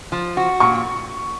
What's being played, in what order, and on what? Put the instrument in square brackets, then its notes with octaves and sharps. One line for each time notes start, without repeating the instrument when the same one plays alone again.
[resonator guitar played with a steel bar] F3
F#4
[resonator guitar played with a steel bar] A#2 [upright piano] C#6